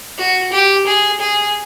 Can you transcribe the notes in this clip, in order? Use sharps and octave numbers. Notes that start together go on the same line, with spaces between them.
F#4
G4
G#4
G#4